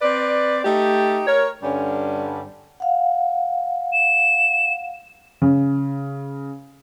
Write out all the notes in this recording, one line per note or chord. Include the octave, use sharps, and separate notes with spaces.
C4 B4 D5
A3 D#4 G4
A#4 C#5
G2 D3 G3 C#4
F5 F#5
E7
C#3